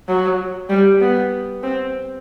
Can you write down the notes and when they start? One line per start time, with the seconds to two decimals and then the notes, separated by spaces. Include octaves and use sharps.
0.08 F#3
0.69 G3
1.00 B3
1.63 C4